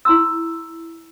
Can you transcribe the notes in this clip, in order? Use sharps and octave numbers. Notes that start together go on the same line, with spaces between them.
E4 A#5 C6 E6